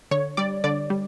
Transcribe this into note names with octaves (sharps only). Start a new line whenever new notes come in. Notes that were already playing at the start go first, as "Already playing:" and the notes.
D3 C#5
G3 D5
D3 D5
G3